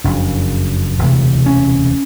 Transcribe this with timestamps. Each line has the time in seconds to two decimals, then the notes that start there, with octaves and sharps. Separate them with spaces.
0.04 F#1 F2 C#3 D4
0.99 E1 D2 C3
1.46 C#4